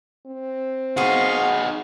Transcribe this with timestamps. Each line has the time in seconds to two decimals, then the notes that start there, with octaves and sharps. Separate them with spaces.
0.26 C4
0.97 B3 D#4 F#4 G#4 F5 C6 C#6